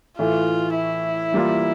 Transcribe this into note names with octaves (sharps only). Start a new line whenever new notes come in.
A2 E3 A3 F4
E4
E3 G3 A#3 F4